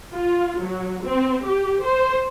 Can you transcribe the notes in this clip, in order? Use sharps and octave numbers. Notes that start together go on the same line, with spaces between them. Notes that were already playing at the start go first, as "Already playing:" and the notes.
F4
F#3
C4
G4
C5